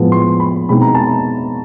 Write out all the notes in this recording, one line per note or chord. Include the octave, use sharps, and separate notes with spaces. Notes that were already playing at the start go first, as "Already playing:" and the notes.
Already playing: A2 F3 G#3 B3
C6
B5
B2 G#3 C4 D#4 B5
A#5
A5
A#5